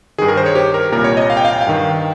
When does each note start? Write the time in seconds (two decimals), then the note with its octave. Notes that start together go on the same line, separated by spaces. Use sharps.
0.18 D#3 G#4
0.22 G2
0.28 A#4
0.37 C5
0.46 C#5
0.55 G4
0.74 A#4
0.92 C2 A#2 A#4
1.04 C#5
1.17 D#5
1.30 F5
1.37 G5
1.45 F5
1.53 G5
1.61 F5
1.67 G2 D#3